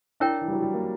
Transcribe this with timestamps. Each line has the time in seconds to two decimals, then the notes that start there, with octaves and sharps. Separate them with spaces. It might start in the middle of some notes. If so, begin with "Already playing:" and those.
0.20 D4 E4 A#4 C#5 G5
0.41 E3
0.48 G3
0.53 F#3
0.62 G3
0.73 A#3